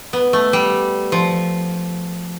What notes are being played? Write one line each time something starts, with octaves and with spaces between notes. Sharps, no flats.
B3
A3
G3
F3